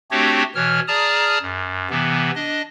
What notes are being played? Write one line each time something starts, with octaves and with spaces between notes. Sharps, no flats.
A3 C4 D4 F#4 G4 C#5
B2 E3 C#5 F6
G#4 D5 A5 A#5 D#6 F6
F#2
C3 E3 B3
D4 D#5